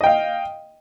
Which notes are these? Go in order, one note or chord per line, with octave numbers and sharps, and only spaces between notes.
D#5 F5 G5